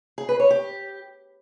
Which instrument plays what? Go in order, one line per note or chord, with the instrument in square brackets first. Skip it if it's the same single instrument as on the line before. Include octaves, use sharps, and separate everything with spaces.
[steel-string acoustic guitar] G#4
B4
C#5
G4